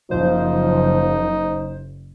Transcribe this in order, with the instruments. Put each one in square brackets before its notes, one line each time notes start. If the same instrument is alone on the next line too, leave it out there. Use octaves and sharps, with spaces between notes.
[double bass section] F#1 [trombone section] F3 [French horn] D#4 [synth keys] C5